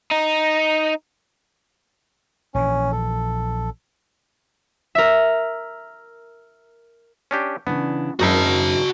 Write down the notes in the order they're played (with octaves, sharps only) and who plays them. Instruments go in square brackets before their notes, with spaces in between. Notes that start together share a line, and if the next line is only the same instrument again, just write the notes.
[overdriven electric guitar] D#4
[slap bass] A#1 E3 [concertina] C#4
[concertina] A4
[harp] A#4 E5
[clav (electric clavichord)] C#4 D4 G4
[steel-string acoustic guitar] C#3 E3 D4 [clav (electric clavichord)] B3
[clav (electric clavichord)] G#1 D#4 E4 [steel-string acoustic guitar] F#2 A#4 [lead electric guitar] F#4 A5